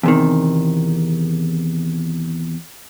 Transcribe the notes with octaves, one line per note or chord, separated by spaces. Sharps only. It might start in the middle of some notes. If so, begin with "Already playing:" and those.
E2 C3 D#3